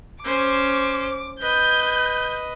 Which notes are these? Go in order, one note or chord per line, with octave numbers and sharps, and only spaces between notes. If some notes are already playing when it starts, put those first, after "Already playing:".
C#4 C5 D6
B4 D#5 G6